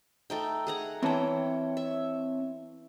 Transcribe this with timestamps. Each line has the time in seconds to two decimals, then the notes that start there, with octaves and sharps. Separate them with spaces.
0.30 A3 D#4 G5
0.67 G#4 F#5 A#5
1.03 E3 C4 C#5 G5 A5
1.77 E5